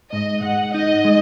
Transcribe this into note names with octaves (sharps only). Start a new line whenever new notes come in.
G#2 D#5
G#2 F#5
D#4 D#5
G#3